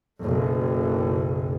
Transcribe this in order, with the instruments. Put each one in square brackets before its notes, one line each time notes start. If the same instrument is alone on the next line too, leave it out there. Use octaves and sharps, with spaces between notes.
[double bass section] F#1 B1